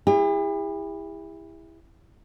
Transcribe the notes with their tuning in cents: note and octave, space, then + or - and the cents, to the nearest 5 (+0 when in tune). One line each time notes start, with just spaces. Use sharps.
E4 +0 G4 +45